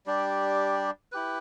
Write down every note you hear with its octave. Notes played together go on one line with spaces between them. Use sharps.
G3 D4 G4 D5
E4 G4 B4